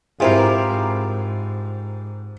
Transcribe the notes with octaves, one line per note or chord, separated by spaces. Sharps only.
G#2 C4 E4 F4 G4 G#4 A#4